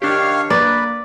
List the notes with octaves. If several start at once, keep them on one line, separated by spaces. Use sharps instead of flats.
D#3 D4 G4 C#5 F5
A#3 B4 D5